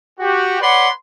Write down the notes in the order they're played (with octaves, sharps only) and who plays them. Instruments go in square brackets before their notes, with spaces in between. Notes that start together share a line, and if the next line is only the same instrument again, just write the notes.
[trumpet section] F#4 G4
B4 C#5 D5 F#5 B5 C6